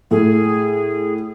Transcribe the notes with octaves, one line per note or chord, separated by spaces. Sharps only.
A2 G#4